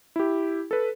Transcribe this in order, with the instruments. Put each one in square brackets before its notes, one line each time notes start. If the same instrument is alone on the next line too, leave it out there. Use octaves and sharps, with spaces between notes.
[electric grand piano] E4 G4
A4 B4